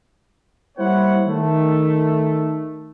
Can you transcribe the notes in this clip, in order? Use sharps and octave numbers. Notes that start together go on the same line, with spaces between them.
G3 A#3 E4 C5 C#5 F#5
D#3 A3